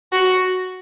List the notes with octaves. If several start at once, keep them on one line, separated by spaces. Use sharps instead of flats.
F#4